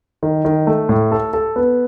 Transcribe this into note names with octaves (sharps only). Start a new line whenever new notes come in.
D#3
D#3
A3
A2
A4
A4
B3